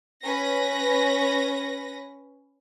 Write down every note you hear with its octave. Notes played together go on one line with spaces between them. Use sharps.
C#4 B4 A#6